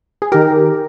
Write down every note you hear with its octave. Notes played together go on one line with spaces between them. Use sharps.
G#4
D#3 G4 A#4